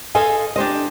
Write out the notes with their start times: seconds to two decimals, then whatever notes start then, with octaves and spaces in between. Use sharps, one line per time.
0.15 A4 C5 D#5 F5 G#5
0.56 D4 G4 C5 D#5